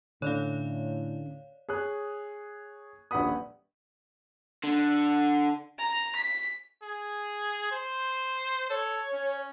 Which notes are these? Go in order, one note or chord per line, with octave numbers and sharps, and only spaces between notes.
A2 D3 C#4 C#5 D5 F5
G#4 C#5 D#6 F#6
D#1 A#1 B4 F#5 B5 D#6
D3
A#5
B6
G#4
C5
A4 C#5
C#4